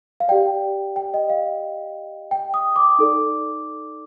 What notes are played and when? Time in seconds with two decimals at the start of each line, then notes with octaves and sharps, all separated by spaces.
0.20 F5
0.29 G4 D5 G5
0.96 G5
1.14 D#5
1.30 F5
2.31 G5
2.54 D#6
2.76 D6
2.99 D#4 A4 D5